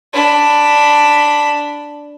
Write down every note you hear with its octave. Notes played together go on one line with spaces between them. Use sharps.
D4 B5